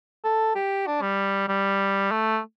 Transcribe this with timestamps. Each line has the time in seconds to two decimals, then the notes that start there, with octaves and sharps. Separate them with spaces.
0.24 A4
0.55 G4
0.87 D4
1.01 G3
1.48 G3
2.11 A3